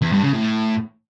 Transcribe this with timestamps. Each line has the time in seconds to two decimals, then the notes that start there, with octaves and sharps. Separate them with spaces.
0.02 E2
0.12 G2
0.23 C#3
0.33 A2